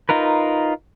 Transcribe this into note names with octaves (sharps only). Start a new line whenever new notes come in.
D#4 F4 A#4 B4